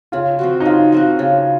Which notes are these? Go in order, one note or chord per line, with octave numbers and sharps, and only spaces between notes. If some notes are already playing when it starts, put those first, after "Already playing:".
C#3 F4
F3 C4 F#4
D#4
C#3 F4
F3 C4 F#4
C#3